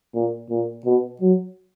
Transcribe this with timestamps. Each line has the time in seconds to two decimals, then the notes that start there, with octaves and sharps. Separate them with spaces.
0.14 A#2
0.50 A#2
0.85 B2
1.21 F#3